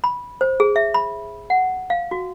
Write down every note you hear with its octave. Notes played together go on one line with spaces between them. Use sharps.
B5
C5
G#4
E5
B5
F#5
F5
F#4